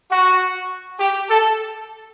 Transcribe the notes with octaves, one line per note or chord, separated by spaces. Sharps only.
F#4
G4
A4